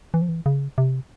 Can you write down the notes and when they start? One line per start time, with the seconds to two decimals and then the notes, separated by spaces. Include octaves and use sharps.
0.14 E3
0.22 F3
0.29 E3
0.46 C#3
0.78 C3